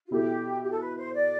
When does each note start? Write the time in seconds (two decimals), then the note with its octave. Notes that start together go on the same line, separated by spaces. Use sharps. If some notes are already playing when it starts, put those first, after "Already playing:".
0.07 F4
0.10 B2 B3 E4 G4 A4
0.62 G4
0.70 A4
0.80 B4
0.97 C5
1.14 D5